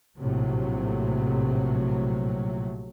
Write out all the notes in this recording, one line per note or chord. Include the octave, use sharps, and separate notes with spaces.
A#1 A2 C3 F#3